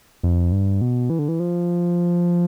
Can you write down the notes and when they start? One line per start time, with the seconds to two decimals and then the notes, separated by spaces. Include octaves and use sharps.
0.23 F2
0.52 G2
0.81 B2
1.10 E3
1.19 D3
1.28 E3
1.40 F3